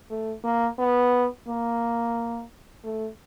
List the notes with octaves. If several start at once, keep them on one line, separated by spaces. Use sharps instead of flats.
A3
A#3
B3
A#3
A3